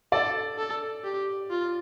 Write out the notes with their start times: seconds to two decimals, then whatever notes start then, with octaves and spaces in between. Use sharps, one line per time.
0.12 A4 D5
0.58 A4
1.04 G4
1.50 F4